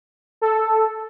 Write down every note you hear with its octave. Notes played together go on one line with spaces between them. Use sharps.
A4